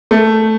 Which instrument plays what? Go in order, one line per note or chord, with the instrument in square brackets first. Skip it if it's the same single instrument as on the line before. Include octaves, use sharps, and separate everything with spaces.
[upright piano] A3